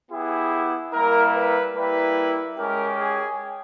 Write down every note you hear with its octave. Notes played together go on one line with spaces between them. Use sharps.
B3 E4 G4 G#4
G3 A#3 E4 A#4
B4
G3 A#3 E4 B4
G#3 C#4 G4 A#4
G#4